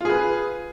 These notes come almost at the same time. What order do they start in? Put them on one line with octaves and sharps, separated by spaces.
F4 G#4 B4